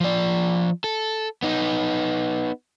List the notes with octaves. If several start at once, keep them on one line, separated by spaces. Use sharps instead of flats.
F3 D5
A4
B3 D#4